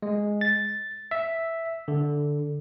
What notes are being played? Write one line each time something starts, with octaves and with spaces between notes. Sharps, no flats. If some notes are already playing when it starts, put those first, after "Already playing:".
G#3
A6
E5
D3